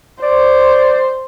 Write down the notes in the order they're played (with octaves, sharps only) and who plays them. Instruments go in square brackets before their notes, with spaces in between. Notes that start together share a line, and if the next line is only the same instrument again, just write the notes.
[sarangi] C5 [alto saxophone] D5